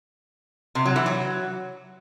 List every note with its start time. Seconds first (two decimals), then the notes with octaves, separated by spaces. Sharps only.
0.75 C3
0.85 F#3
0.96 E3
1.06 F#3